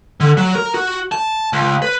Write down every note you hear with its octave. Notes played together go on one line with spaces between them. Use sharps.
D3
F#3
A#4
F#4
A5
C#2
B4